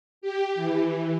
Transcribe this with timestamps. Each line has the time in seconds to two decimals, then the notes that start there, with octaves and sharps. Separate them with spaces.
0.21 G4
0.55 E3